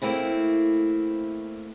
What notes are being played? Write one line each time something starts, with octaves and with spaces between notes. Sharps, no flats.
A3 A#3 C4 E4